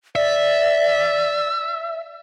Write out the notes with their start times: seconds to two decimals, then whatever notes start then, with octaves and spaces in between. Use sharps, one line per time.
0.15 D5 E5